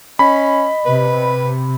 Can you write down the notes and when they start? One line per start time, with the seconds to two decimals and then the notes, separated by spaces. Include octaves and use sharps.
0.19 C#4 D#5 B5
0.85 C3 B4